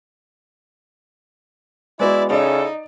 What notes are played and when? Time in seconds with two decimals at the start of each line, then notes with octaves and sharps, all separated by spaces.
2.00 G#3 B3 E4 F#4 D5
2.30 C#3 C#4 D#4 E4 A4 D5